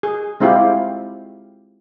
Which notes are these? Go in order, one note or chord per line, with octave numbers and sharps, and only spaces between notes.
G#4
G#3 C4 E4 F4 G4